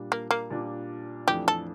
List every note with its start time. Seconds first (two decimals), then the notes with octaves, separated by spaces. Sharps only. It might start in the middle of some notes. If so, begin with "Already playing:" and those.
Already playing: A#2 G3 D4
0.12 A#3
0.31 A#3
0.50 A#2 G3 D4
1.28 F2 E3 A3 D4 G4
1.48 A4